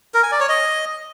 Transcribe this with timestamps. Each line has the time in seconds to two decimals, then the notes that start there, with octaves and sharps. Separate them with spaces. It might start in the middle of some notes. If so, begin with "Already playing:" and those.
0.14 A#4
0.23 G#5
0.32 D5
0.40 C#5
0.49 D#5